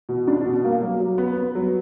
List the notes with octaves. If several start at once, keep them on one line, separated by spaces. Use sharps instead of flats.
B2
D4
B2
A#3
F#3
F#3
B3
B3
F#3